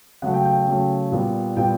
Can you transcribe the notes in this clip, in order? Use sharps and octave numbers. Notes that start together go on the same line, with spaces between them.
C#3 F#3 A3 C#4 F#5
G5
G5
G5
C#3 F#3 A3 C#4
A#2 G3 B3
A#2 G3 B3 G5